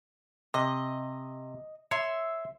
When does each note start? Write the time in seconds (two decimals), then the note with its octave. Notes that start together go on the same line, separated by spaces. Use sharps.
0.54 C3 D#5
1.91 C#5 E5 C6